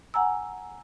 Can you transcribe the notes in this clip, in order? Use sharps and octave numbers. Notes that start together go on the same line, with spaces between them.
F#5 G#5 A#5 E6